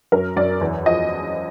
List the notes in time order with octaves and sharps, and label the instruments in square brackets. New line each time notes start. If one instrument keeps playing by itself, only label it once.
[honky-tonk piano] F#2 A#4
F#2 D5
E2
F3 D#5